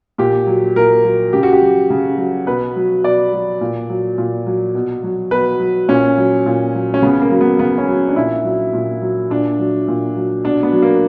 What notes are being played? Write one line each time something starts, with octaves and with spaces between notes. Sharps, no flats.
A#2 G4
F#3
A#2 A#4
F#3
C#3 G4
F#4
G4
F#3
C#3
F#3
B2 B4
F#3
B2 D5
F#3
A#2
F#3
A#2
F#3
B2
F#3
B2 B4
F#3
A#2 C#4
F#3
A#2
F#3
C#4
C#3 B3
A#3
F#3
B3
C#3 B3
C#4
F#3
D4
A#2 E4
F#3
A#2
F#3
A#2 D4
F#3
A#2
F#3
B2 D4
B3
F#3
A#3